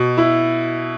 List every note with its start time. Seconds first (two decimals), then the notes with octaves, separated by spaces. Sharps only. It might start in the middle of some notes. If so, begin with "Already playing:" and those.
Already playing: B2
0.18 E4